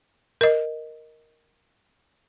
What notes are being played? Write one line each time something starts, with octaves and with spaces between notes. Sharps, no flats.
A#4 D#5